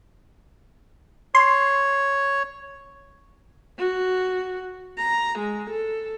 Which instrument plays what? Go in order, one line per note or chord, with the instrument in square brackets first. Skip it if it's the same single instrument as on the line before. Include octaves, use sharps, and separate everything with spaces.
[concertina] C#5 [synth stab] C6
[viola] F#4
A#5
G#3
A4